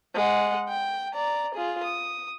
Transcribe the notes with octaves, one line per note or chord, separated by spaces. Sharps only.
G#3 F#5
G5
D5 A#5
F4 G#4
D#6